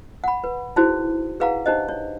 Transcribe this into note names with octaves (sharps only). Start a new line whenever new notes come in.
F#5 B5
B4
D#4 E4 F#4 G#4 C5
G#4 B4 F5 F#5 A#5
D4 D#4 G4 C5 D#5
C#5